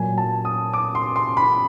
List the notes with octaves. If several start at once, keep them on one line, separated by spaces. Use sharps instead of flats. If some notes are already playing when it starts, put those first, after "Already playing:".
Already playing: A#2 F#3 G#5
A5
D#6
D6
C6
C6
B5